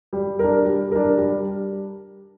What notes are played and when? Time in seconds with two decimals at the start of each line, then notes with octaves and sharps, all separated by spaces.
0.13 G3
0.39 D4 A#4
0.65 G3
0.92 D4 A#4
1.17 G3